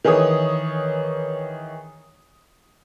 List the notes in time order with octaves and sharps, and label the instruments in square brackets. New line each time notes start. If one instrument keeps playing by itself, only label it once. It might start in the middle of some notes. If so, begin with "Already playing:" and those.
[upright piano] D#3 E3 G#4 C#5 D#6